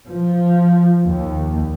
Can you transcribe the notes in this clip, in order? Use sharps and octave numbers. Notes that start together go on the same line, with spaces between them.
F3
D#2